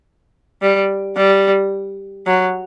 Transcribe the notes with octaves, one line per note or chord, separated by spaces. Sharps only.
G3
G3
F#3